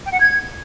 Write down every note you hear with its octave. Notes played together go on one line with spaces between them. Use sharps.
G5
F#5
G#6